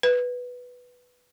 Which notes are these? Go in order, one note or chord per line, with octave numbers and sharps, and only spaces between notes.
B4